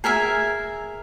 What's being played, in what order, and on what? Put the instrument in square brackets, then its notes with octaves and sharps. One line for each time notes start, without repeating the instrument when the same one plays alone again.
[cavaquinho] G#4 A#4 E5 G#5